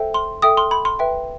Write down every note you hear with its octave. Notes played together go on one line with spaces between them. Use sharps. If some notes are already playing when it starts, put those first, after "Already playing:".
Already playing: A4 C5 E5 G5
C6
A4 E5 G5 D#6
C6
B5
C6
B4 E5 G5